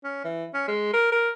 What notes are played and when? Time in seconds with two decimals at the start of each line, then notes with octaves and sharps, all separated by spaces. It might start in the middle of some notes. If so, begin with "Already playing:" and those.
0.04 C#4
0.24 E3
0.54 C#4
0.68 G#3
0.93 A#4
1.12 A#4